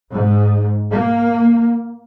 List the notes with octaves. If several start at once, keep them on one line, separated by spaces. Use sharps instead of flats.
G#2
A#3